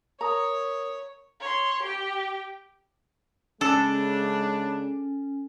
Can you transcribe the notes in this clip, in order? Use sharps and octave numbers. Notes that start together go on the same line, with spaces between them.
A#4 C#5 A#5 D#6
C#5 C6
G4 G5
C#3 G#3 C#4 D4 A4